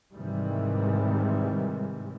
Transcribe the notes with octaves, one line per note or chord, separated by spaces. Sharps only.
G#2 C3 D#3 E3 G3 G#3